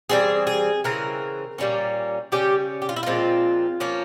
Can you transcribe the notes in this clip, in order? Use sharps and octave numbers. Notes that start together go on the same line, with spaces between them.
E3 G3 C4 G#4
G#4
C#3 E3 C4 A#4
A#2 G3 A#3 C#4
C#3 G3 C#4 G4
G4
F4
E4
A#2 F3 G#3 C4 F4
F3 A#3 C#4